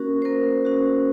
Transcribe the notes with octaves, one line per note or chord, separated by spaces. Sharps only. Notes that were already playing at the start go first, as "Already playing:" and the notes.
Already playing: A#3 C#4 F#4 A#4
C5
A#3 A#4
C#4 F#4